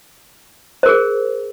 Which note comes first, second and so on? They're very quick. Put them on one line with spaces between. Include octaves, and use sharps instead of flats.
C5 A#4 G#4